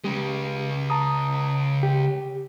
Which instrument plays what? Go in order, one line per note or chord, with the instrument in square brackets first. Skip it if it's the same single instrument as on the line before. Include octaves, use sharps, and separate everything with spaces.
[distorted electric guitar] C#3 G#3 [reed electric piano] G4
[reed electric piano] A5 A#5 D#6
G4